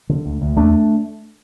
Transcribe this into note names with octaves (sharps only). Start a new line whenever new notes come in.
D3
D2
D2
E2 A3 D4